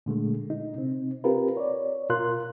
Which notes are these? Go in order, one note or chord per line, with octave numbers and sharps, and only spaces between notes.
A#2 D3 G#3 A3
D#4
C3 C4
C4 F4 G4 A#4 B4
C#5 D5
B2 F4 A#4 C6 F#6